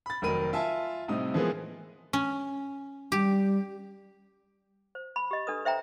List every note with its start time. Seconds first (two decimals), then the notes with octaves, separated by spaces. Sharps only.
0.06 B5 A6
0.22 F1 D#3 F#3 A#4 B5 D#7
0.53 F4 E5 G#5 A5
1.08 A2 C3 G3 D#4 D#6
1.34 E3 F3 G#3 B3 G#4 A#4
2.13 C#4
3.12 G3 G4
4.95 C5
5.16 B5
5.31 G4 D#5
5.47 D4 A4 B4 D#6
5.65 C5 E5 G5 A#5